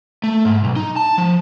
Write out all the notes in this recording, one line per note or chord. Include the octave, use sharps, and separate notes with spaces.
A3
G#2
B1
D#4
A5
F3